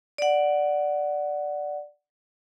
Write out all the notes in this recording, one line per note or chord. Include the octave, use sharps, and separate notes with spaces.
D5 F#5